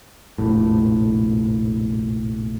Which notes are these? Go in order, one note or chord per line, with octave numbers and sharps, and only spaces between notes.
F1 A#1 A2